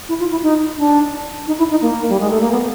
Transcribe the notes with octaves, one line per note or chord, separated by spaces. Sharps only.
E4
F4
E4
D#4
D4
D#4
E4
D#4
A#3
G3
G#3
A3
A#3
B3